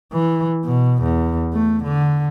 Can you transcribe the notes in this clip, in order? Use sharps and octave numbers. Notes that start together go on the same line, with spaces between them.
E3
B2
E2
A3
D3